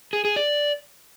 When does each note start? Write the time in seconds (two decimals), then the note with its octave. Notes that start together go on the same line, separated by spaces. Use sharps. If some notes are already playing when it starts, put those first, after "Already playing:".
0.13 G#4
0.25 G#4
0.36 D5